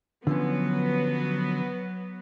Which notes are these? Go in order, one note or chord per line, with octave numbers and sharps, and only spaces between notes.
D3 F3 F#3 B3 C#4